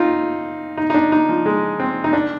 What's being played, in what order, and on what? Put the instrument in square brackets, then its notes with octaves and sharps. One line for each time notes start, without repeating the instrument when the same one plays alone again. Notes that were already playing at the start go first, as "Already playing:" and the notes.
Already playing: [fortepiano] C4 D#4 F4
D#4
D#4
D4
D#4
F3
G#3
C4
D#4
D4